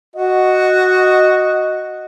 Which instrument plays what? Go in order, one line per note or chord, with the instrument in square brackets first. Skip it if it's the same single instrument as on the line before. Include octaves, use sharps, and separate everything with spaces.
[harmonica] F#4 [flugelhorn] D#5